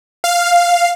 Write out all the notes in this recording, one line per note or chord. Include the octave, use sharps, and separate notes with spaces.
F5